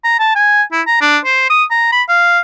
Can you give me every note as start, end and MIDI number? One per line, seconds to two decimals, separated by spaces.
0.04 0.15 82
0.19 0.32 81
0.35 0.63 80
0.72 0.81 64
0.87 0.97 82
1.01 1.18 62
1.25 1.45 72
1.50 1.64 87
1.70 1.91 82
1.92 2.03 83
2.09 2.40 77